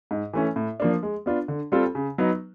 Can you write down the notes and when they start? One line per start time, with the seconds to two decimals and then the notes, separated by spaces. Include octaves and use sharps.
0.11 G#2
0.33 E3 A3 C#4
0.56 A2
0.80 F3 A#3 D4
1.03 G#3
1.26 B3 D4 F4
1.48 D3
1.72 G3 C4 F4 A4
1.95 C#3
2.18 F#3 B3 D#4